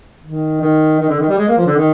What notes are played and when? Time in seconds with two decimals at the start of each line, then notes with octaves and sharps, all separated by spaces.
0.23 D#3
0.61 D#3
0.99 D#3
1.09 D3
1.19 D#3
1.29 G3
1.38 G#3
1.48 A#3
1.57 F3
1.67 D3
1.77 D#3